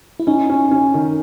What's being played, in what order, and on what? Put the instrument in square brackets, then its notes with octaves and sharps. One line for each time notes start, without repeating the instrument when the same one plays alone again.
[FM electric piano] E4
[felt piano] C#4 [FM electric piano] D#4
[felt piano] C#4
C#4
D#3